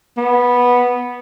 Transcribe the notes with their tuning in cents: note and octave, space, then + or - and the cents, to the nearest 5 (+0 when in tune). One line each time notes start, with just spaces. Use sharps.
B3 -10